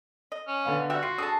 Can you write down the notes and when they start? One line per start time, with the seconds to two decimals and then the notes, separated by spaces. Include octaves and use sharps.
0.32 D#5
0.48 C#4
0.65 D3 B3 F5
0.90 G3 F#4 G4 E5
1.03 F4 C7
1.18 D3 G#4 A5 D#6